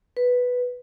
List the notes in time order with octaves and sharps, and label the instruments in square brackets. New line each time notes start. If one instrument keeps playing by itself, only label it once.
[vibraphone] B4